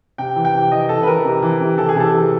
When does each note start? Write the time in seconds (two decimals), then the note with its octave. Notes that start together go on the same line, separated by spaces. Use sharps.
0.18 C3 G5
0.36 E3
0.45 G5
0.53 C3
0.72 E3 D#5
0.89 C3 A4
1.03 B4
1.07 E3 A#4
1.25 C3
1.42 E3
1.61 C3
1.78 E3 A4
1.89 G#4
1.96 C3 A4
2.14 E3